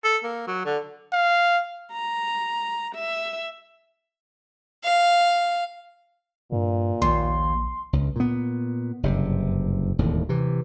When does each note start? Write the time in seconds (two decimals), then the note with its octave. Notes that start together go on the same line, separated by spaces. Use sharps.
0.04 A4
0.24 A#3
0.48 F#3
0.65 D3
1.13 F5
1.92 A#5
2.95 E5
4.84 F5
6.52 G2 A#2
7.02 A#1 D#2 C6
7.93 C#2
8.16 A#2 B3
9.03 F#1 G2 C3
9.99 E1 D#2 A2
10.29 C3 E3